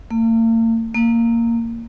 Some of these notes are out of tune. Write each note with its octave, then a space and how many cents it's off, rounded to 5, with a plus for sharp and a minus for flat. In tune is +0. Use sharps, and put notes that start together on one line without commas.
A#3 -45
A#3 -10